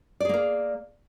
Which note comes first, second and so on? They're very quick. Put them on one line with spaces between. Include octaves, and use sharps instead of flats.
D5 G#4 A#3 A#4